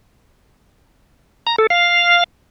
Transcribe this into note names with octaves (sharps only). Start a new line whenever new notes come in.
A#5
A4
F5